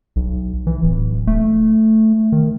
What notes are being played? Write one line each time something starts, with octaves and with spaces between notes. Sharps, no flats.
B1
E3
D1
A3
D#3